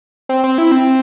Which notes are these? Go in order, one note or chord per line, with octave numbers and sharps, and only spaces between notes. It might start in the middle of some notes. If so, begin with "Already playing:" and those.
C4
C4
E4
C4